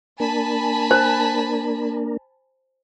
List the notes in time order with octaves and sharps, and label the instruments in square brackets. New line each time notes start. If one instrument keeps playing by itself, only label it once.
[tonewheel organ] A#3 D4 A#4 [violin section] G#5 A5 B5
[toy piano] C5